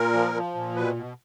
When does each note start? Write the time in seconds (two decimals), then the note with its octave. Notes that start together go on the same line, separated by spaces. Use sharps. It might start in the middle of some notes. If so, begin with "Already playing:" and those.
Already playing: A#2 A#4
0.13 F3
0.34 F3
0.55 A#2
0.76 B2 B4
0.96 B2